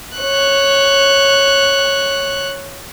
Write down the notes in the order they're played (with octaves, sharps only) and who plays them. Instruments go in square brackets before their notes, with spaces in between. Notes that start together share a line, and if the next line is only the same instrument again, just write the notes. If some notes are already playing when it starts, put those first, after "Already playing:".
[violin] C#5 F#6